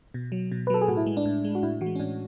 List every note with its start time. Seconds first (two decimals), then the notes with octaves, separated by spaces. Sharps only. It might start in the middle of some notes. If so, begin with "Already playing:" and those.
0.14 B2
0.32 F#3
0.51 B2
0.67 B4
0.70 F#3 A4
0.81 G#4
0.88 A2 F#4
0.97 E4
1.06 G#3
1.17 D4
1.25 A2
1.45 G#3
1.55 F#4
1.63 A2 E4
1.81 E3 F#4
1.86 G#3
1.96 C#4
1.99 A2 D4